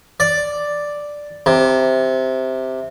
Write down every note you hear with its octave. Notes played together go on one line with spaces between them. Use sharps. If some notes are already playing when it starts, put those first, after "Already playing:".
D5
C3